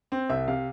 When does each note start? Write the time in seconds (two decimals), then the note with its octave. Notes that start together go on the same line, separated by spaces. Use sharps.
0.12 C4
0.29 C2 E5
0.48 C3 F5